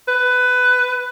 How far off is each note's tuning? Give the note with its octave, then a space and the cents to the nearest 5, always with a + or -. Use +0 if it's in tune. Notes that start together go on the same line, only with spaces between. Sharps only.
B4 +15